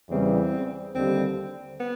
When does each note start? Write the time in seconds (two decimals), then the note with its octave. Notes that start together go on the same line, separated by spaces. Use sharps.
0.10 E2 C#3 E3 G3 C4
0.95 D#2 D3 G3 C4
1.80 B3